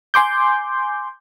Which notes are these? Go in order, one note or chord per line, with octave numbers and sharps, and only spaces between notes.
G#5 C6 D6 G6